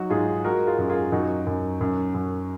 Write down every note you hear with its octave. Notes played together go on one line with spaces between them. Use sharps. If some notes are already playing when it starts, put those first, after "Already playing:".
Already playing: F#3 D#4 F#4
G#2 F4 G#4
G#3 F#4 A#4
F4 G#4
F#2
F4 G#4
F#2 D#4 F#4
F#2
F#2
F#2